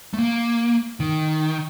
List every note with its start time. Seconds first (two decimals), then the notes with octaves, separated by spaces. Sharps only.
0.14 A3
0.18 A#3
1.00 D#3